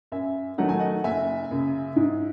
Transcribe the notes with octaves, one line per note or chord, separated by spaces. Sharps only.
F#2 E5 G#5
D#3 F#3 A3 D#4 F#5
G#5
D#5 F#5
F#1 E5 G#5
F#2 C#3
G#2